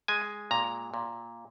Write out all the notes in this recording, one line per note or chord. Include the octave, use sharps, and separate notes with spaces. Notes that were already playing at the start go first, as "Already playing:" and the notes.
G#3 G#5
A#2 A#5
A#2